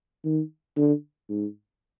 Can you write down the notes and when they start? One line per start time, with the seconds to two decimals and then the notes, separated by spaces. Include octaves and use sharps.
0.25 D#3
0.77 D3
1.30 G#2